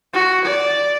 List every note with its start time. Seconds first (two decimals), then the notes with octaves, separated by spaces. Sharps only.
0.14 F#4
0.45 D5